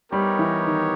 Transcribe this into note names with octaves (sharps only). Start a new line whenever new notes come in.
G3 B3 D#4 G4 A#4 C#5
E3
D#3